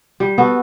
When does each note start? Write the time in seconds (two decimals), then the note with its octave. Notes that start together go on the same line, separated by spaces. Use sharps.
0.20 G3
0.38 B3 F#4 A4